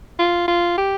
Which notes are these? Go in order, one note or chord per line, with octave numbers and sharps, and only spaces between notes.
F4
F4
G4